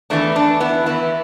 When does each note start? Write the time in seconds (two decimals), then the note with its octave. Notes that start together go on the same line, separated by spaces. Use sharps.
0.10 E2 E3 A3 D4
0.36 A3 D4
0.60 B3 E4
0.86 E2 E3 B3 E4